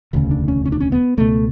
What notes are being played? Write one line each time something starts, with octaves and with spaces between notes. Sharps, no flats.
E1 D2 C#3
D4
C#4
C#4
D4
C#4
B3
C#2 B2 A3